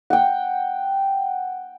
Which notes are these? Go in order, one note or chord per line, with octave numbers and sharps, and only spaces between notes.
F#5 G5